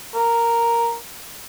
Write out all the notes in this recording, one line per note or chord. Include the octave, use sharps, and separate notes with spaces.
A#4